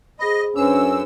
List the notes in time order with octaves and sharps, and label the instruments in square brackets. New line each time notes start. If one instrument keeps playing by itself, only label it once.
[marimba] G#4 C5 B5 [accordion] D#5
[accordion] F#2 E6 [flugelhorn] C#4 [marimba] D4 B4 C5